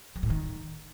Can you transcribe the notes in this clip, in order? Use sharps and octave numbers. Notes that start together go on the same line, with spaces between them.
F#3
A2
D#3